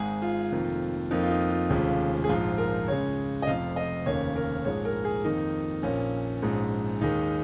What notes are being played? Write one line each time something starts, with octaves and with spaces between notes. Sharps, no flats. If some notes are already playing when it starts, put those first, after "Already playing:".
Already playing: G#1 G#2 G#3 G#4
F4
F1 F2 D#3 A#3
F2 F3 A#3 D#4
F4
D#4
F4
F1 D#2 C#3 F3 G#3
G#4
A#1 G#2 F3 F4
A#4
C#2 C#3 G#3 C#5
D#5
F1 F2 F3 F5
D#5
F1 D#2 C#3 A#3 C#5
A#4
A#1 G#2 G#3 C#5
A#4
G#4
F2 D#3 A#3 D#4
A#1 A#2 A#3 C#4
A#1 G#2 G#3
D#2 D#3 G#3 D#4